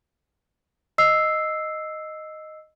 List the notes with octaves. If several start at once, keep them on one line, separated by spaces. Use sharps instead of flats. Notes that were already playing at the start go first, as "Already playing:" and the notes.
D#5 E6 C7